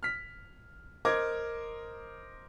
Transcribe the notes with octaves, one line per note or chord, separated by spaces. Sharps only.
F6 B6
A#4 C5 D#5 D6 G#6